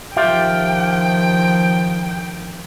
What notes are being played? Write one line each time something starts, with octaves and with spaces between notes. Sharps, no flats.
D#3 F3 F4 G4 E5 G5